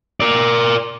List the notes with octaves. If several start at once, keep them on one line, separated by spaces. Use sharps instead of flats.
A#4 D5